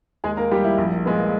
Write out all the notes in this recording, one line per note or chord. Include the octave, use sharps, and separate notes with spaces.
D#2 G#3 G#4
A#3 A#4
D#3 G3 A#3 G4
E4
A#1
A#2 G#3 B3